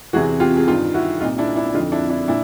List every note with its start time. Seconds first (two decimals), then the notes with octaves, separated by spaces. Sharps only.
0.13 E2 C3 E3 F#4 G#4
0.40 F4 G4
0.56 G#4
0.67 G2 D#3 F4 G4
0.94 E4 F#4
1.21 C2 D#4 F4
1.25 A#2
1.38 D4 E4
1.56 D4 E4
1.74 D3 D#4 F4
1.79 F2
1.92 D4 E4
2.10 D4 E4
2.28 A#2 D4 E4